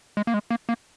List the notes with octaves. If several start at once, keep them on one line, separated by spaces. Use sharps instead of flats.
G#3
A#3
G#3
A#3
A#3